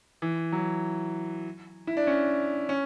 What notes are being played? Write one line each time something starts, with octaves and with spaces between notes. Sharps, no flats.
E3
F#3
E4
D4
C#4
C#4